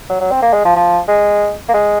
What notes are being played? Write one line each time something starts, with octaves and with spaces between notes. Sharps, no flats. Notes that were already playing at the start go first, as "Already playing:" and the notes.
F#3
F#3
C4
A#3
G#3
F3
F3
G#3
A#3
G#3